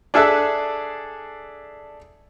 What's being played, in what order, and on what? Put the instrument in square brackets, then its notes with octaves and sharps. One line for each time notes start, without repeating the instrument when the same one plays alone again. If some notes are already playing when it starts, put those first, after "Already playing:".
[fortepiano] D4 G#4 A4 E5 F#6